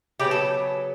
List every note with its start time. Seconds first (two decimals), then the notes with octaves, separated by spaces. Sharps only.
0.20 C#3 F#3 B3 G4
0.31 A4